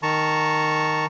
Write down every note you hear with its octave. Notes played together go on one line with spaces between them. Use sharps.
D#3 A5 A#5 C#6